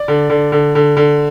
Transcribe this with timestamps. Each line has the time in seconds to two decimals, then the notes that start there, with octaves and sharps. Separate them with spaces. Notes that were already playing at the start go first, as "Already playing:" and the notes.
Already playing: D5
0.08 D3
0.30 D3
0.52 D3
0.75 D3
0.97 D3